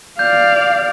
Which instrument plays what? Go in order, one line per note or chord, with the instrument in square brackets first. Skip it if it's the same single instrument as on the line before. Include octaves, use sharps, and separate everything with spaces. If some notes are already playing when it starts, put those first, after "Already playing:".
[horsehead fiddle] D5 F5 [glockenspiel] G6